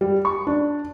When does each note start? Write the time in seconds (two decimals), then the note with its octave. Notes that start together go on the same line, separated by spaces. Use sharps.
0.01 G3
0.25 C#6
0.47 D4